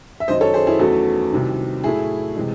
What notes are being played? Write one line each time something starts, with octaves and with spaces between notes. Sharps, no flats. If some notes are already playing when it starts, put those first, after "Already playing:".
E5
F#2 D#3 F#3 C5 D#5
A4 C#5
G#4 C5
E4 G#4
E2 D#3 F#3 A3 C#4 F#4 A4
C2 C3 D#3 F#3
A2 F#3 A3 E4 G#4
C3 E3 G#3